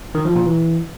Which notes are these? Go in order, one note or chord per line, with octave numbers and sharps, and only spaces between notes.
D#3
F3
A#2
E3